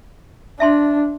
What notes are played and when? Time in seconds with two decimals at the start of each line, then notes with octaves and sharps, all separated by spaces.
0.60 D4 E5 A5 C6